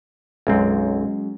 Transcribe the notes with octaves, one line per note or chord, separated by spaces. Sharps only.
B1 F#2 F#3 G#3 C4 C#4